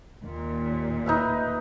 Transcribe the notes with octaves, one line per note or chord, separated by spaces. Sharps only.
D#2 A#2
D#4 B4 E5